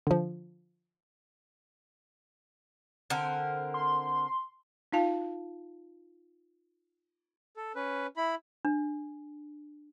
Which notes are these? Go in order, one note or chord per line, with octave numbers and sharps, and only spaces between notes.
D3 F3
D3 C4 A#4
C6
D#4 F4 F5 A5
A4
C#4 B4
E4 B5
D4